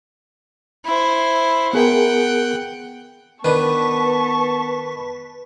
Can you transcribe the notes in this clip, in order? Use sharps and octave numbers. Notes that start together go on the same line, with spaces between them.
E4 C5
B3 G#4 A#4 F#5 G5
D#3 B3 D4 B4 C5 A5 C#6